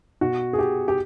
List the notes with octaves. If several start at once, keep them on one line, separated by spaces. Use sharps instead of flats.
B2 F#4
G#4
G4
G4